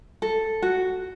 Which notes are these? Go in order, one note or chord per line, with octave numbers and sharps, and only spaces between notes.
A4
F#4